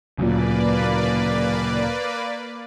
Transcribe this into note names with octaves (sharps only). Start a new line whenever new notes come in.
D2 A#2 C#3 F#3 A#3 B4 D5